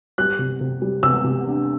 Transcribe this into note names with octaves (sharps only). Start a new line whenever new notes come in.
G3 F#6
C3
C3
G3
C3 E6
C3
D4